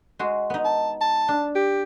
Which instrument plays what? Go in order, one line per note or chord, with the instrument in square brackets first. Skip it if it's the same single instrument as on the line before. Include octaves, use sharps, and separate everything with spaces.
[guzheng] G#3 F#4 C5
B3 D#4
[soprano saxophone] A5
A5
[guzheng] D4
[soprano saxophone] G4